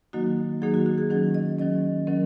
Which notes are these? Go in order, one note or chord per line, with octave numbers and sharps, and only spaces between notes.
D#3 F#3 A#3 D#4 F#4
D#3 F#3 A#3 D#4 G#4
F#4
F#4
G#4
D#3 F#3 C#4 G#4
D#5
D#3 F#3 C#4 D#5
D#3 F#3 C#4 A#4